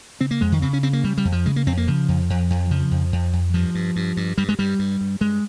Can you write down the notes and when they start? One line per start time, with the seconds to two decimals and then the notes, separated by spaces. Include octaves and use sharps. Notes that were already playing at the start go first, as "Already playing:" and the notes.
0.20 C#3 C4
0.31 A#3
0.41 F2 G#3
0.52 D#3
0.62 C#3 C4
0.73 C#4
0.83 C#3 C4
0.93 A#3
1.04 C#3 G3
1.18 G3
1.25 F2
1.32 F3
1.46 C#3 G#3
1.56 A#3
1.66 F2 C4
1.77 A#3
1.87 C#3 F3
2.08 F2
2.30 F2
2.50 F2
2.71 C#3 F3
2.91 F2
3.12 F2
3.33 F2
3.54 G2 F3
3.75 G2
3.96 G2
4.17 G2
4.38 G2 G3
4.49 G#3
4.59 G2 G3
4.79 G2
5.01 G2
5.21 G2 G#3